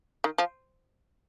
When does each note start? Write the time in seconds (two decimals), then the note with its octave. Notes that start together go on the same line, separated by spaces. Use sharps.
0.24 D#3
0.38 F3